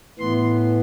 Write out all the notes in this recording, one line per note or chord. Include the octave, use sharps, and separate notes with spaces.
A2 E3 B3 C6